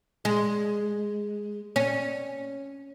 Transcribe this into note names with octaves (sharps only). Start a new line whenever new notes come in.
G#3
C#4